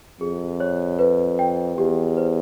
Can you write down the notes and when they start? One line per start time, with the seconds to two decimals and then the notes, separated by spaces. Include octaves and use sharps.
0.20 F2 G#4
0.60 C#5
0.99 B4
1.39 G5
1.77 E2 G4
2.17 C5